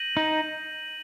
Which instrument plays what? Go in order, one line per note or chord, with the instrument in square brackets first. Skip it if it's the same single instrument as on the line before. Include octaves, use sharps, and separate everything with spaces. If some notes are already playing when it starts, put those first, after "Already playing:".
Already playing: [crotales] G6 A#6 D#7 F#7
[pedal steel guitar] D#4